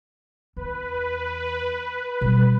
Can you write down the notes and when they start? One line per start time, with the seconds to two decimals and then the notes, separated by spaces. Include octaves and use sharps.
0.56 E2 B4
2.21 B2 G3